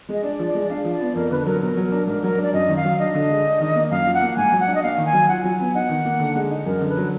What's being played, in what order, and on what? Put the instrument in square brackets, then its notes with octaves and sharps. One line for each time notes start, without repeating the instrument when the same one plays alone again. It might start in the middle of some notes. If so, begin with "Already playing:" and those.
[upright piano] G#3 [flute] D#5
[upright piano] D4 [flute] D5
[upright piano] F3
[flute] D5
[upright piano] G#3
[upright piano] D4 [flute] F5
[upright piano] F3
[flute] D5
[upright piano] B3
[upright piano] F2 [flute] A#4
[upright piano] D3 [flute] B4
[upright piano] F#3 [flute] A#4
[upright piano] B2 [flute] A#4
[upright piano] F#3
[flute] A#4
[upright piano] D4
[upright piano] G#2 [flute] A#4
[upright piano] F#3 [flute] A#4
[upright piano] D4
[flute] D5
[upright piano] F#2 [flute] D#5
[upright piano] D#3
[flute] F5
[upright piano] F#3
[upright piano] D4 [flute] D#5
[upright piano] D3
G#3
D4
D#3
A#3
[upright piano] F#2 [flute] F5
[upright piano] F3
[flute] F#5
[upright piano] A#3
[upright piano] G#2 [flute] G#5
[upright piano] F#3
[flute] F#5
[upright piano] D4
[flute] D#5
[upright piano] A#3 [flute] F5
[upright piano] D#3
[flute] G#5
[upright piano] F#3
[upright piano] F4 [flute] F#5
[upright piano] F#3 [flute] G#5
[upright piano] B3 [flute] G#5
[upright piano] D#4 [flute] F#5
[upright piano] D#3
A#3
D3
G#3
D#4
[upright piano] F#2 [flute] A#4
[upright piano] D3
[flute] B4
[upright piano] F#3